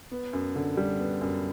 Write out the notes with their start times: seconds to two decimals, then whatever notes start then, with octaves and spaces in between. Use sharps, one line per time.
0.11 B3
0.33 F#2
0.56 D3
0.77 G3
0.99 B3
1.21 F#2